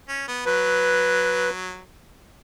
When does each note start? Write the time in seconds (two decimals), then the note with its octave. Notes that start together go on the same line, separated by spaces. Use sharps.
0.09 C#4
0.28 B3
0.46 F#3 B4